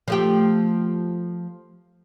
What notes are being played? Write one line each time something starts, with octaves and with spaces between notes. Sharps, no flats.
F3 A3 G4